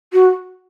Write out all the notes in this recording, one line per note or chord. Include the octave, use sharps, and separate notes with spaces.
F#4